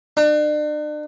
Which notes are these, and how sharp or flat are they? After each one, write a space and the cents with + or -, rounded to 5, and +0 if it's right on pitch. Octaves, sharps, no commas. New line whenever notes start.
D4 +40